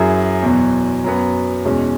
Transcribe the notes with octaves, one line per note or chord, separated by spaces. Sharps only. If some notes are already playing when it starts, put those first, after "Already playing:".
Already playing: F#2 F#3 E4 G#4
E2 B2 F#3
F#2 F#3 B3
E2 B2 G#3 C#4